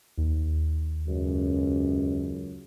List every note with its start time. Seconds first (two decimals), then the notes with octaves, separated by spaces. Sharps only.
0.17 D#2
1.07 C#2 F#2